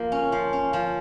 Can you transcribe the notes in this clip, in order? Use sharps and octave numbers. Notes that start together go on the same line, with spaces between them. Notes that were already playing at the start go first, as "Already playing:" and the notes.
Already playing: F3 A#3
C#4
F3
C#4
F3